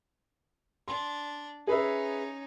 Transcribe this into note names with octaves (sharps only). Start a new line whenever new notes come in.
D4 C6
C#4 D#4 G#4 B4 E5